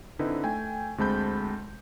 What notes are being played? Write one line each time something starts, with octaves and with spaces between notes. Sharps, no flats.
D3 C4 D#4 E4 B4
A3 G5 G#5
D2 G#3 C4 A5 B5 G6